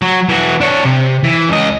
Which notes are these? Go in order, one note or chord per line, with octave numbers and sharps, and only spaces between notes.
F#3
E3 F#4
D4 C#5
C3
E3
C#2 D#5